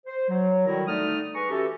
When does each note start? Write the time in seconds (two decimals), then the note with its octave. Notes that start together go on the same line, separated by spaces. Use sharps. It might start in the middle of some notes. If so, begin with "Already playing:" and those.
0.06 C5
0.29 F#3
0.66 D3 D#3 G3 E4 F#4 A#4
0.86 D3 G3 A3 D#4 D#6 F6
1.34 G#4 B4 A#5 C#6
1.50 E3 C#4 F#4 G4 A4